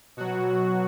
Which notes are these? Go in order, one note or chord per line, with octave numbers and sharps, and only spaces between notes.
B2 F#3 F#4